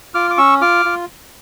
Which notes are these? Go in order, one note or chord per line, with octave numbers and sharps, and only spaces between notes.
F4 D6 F6
D6
C#4 C#6 E6
F4 D6 F6
F4